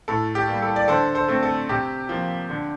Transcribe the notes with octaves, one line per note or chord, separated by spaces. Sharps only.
A2 A4
G4
G3 A#3
A4
D5
D3 A4 C5
A4 C5
A3 C4
A4
C3 G4
F3 A#3
D3